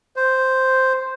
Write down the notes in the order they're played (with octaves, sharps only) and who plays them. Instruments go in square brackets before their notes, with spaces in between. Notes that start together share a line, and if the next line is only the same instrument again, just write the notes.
[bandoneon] C5